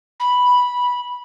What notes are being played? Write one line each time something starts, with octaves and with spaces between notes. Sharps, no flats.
B5